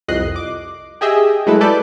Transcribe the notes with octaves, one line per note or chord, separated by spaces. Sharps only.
C2 F2 D#5 F#6 C7
D6
G4 G#4 D#5 E5 G5
F#3 G#3 A3 E4 A4 B4
A4 B4 D5 A5 D6 G6